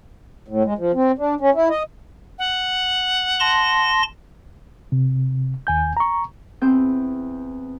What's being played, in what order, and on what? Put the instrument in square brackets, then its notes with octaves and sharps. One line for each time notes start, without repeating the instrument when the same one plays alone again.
[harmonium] A2
G#3
F3
C4
D4
C#4
E4
D#5
[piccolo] F#5
[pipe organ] A5 C6 A#6
[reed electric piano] C3
D#2 G#5 G6
A#5 C#6
[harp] E2 C4 G6